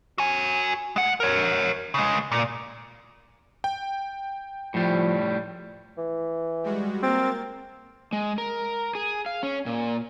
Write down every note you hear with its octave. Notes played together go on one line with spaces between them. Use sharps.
F#4 G#5
G#3 F#5
A#4 C#5
C#3 G#3
A#2
G5
A2 F3 G3
E3
G3 G#3 F#4
A#3 C4 A#4 A6
G#3
A#4
G#4
F5
C#4
A#2